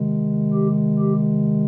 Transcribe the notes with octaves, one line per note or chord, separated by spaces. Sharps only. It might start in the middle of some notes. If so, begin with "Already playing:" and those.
Already playing: C3 D#3 G#3
G4
G4